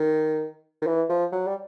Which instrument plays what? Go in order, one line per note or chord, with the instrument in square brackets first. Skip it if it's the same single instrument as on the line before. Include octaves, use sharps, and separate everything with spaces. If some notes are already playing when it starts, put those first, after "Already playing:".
Already playing: [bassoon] D#3
D#3
E3
F3
F#3
G3